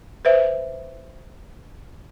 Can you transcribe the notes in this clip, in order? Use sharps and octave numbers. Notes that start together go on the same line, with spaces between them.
B4 C5 E5